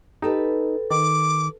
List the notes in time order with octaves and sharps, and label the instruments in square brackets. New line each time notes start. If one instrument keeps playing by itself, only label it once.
[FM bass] D#4 [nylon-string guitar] G4 A4 B4
[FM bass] D#3 [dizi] D6